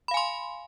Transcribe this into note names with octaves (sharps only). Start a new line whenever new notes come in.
F5 G#5 B5 C6